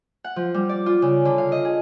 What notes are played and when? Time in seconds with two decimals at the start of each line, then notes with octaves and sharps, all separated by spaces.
0.24 F#5
0.36 F3
0.54 G3
0.69 D5
0.86 F4
1.02 C#3
1.25 D3
1.38 F5
1.52 D#5
1.65 G#4